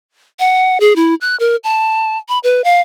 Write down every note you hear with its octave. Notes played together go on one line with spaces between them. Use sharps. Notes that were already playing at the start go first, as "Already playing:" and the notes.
F#5
G#4
E4
F#6
A#4
A5
B5
B4
F5